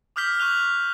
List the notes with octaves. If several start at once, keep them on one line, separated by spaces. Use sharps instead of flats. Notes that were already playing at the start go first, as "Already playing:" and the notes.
D6 D#6 F6 G6 B6 G7
C#6 F6 F#6 F7 G7